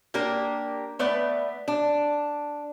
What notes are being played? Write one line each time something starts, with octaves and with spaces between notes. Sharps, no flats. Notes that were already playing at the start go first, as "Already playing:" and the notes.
A#3 D4 G4 A#4
A3 B3 B4 D5
D4